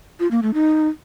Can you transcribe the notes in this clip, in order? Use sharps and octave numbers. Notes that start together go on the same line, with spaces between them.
F4
A#3
A3
D#4